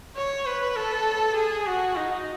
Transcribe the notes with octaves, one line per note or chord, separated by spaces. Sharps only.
C#5
B4
A4
G#4
F#4
D#4